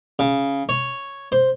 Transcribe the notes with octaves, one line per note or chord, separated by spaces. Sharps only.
C#3
C#5
C5